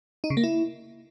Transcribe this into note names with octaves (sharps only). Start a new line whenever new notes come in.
D#4
C#3
A#3
E4